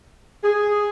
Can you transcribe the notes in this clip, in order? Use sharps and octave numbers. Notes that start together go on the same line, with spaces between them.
G#4